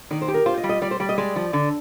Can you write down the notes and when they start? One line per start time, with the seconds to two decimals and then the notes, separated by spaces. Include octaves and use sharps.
0.11 D#3 D5
0.22 C5
0.28 G4
0.34 A#4
0.46 F4 C5
0.57 D#5
0.64 G3
0.69 D#5
0.82 G3 D5
0.91 C5
1.00 G3 D5
1.09 D#5
1.18 G#3 D5
1.36 F3
1.53 D3